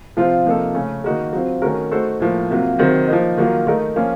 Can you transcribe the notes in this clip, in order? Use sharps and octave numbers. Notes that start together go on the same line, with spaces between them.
C3 F3 C4 F4
C3 F3 A#3 D#4 A4
C#3 A3 C#4
D#3 A#3 D#4 F#4 A#4
F#3 C4 F4
D#3 A3 C#4 F#4 A#4
A3 D#4 F#4 A4 C5
A2 F3 A#3
C3 F#3 A#3 F4
C3 D#3 F#3 C4
F3 A#3 D#4
D#3 F#3 A#3 F4
D#3 A3 D#4 A#4
F3 A#3 C#4 F4